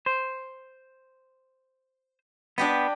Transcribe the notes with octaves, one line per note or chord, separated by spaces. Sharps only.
C5
B3 D4 G4 D#5